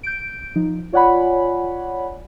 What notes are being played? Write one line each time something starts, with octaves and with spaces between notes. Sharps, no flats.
G6 D7
F3 D#4
F4 C#5 D5 F#5 G#5 B5